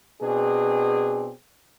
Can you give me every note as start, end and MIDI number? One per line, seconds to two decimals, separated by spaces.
0.21 1.30 47
0.21 1.30 60
0.21 1.30 62
0.21 1.30 68